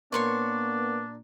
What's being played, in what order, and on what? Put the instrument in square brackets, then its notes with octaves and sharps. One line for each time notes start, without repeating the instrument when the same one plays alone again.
[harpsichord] A#2 [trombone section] A#3 B3 [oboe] D4 [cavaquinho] C#5 C6 C#6